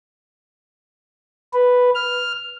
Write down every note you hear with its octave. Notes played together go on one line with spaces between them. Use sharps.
B4
F6